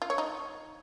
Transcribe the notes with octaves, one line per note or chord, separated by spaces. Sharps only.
F4
C#5
D#4